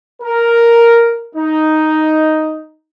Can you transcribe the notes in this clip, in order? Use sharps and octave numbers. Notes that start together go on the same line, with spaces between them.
A#4
D#4